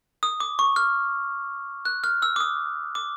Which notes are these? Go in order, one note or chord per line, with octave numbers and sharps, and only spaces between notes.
D#6
D6
C#6
F6
F#6
F6
E6
D6
D#6
D6